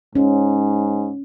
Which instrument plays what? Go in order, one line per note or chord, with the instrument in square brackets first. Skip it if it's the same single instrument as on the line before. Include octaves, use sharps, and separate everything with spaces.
[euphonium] G#2 [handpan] C#4